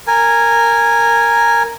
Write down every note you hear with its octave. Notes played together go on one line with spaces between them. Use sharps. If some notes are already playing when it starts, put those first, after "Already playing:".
A#4 G#5